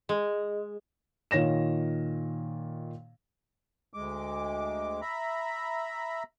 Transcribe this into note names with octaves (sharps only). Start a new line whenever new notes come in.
G#3
A#2 D#3 C#5 A#6 E7
D2 G#3 D6
E5 A#5 B5